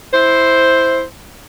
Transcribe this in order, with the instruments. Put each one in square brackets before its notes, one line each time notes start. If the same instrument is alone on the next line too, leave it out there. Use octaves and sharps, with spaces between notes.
[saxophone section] E4 C5